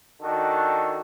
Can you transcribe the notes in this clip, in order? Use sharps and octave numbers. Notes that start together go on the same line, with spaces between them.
D#3 D4 F#4 A4